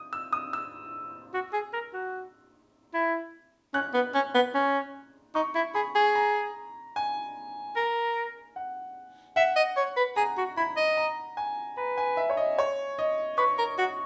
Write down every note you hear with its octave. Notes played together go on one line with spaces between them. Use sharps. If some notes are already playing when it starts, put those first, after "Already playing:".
Already playing: D#6
E6
D#6
E6
F#4
G#4
A#4
F#4
E4
C#4 F#6
B3
C#4
B3
C#4
D#4 C#6
E4
G#4 B5
G#4
A#5
G#5
A#4
F#5
E5 F#5
D#5
C#5
B4
G#4 A#5
F#4
E4 B5
D#5
A#5
G#5
B4 A#5
G#5
E5
C#5
D#5
C#5
D#5
B4 C#6
A#4
F#4